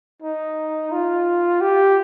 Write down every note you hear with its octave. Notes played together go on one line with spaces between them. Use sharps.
D#4
F4
G4